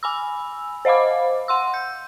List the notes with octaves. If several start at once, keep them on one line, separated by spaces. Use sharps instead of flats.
G#5 B5 E6
C5 D#5 F5 B5 D6
F#5 C6 E6
G6